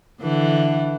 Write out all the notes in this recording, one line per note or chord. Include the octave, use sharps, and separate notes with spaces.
D3 E3